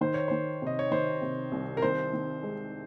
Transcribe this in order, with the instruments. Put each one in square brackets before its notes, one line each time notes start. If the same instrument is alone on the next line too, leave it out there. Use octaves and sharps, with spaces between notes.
[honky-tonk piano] D#3 [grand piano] C5
[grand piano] C#5
[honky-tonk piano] D#3 [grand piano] C5
[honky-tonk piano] C3 [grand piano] D#5
[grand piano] C#5
[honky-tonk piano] D#3 [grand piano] C5
[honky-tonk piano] C3
C2
[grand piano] A#4
[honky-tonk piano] D#3 [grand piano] C5
[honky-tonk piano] D#3
G#3